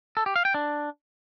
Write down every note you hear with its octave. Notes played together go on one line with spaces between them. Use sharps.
A4
G4
F5
G5
D4